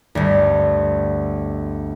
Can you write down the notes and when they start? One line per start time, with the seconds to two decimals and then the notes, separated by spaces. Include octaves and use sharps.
0.15 G1 D2